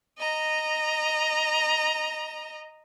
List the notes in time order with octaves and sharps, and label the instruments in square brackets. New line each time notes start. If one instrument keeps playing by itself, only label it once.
[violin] D#5 A#5